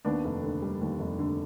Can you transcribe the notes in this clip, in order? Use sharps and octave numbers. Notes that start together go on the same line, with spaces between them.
D#2 B3 D4
F1
D3
G3
D#2
F1
D3